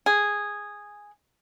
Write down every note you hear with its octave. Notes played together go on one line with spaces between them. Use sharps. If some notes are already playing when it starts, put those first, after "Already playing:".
G#4